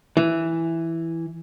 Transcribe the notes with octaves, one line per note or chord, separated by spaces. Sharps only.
E3